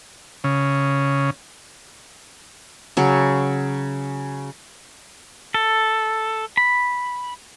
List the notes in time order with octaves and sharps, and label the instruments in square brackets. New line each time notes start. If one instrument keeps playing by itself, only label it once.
[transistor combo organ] C#3
[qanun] C#3 F#3
[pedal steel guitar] A4
B5